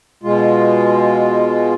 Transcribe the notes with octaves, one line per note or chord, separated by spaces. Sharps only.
B2 G#3 F4